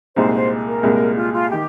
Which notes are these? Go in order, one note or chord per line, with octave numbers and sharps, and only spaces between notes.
C2 A#2 G#3 D#4 C5
C5
A#4
C2 A#2 G#3
F4
F4
D#3 G4